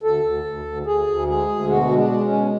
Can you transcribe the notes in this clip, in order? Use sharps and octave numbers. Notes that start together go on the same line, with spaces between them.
D2 A4
D2
D2
D2
D2 G#4
D2
G#3 G#4
D2
B2 F#4
G#3
D4
G#3
C#4
B2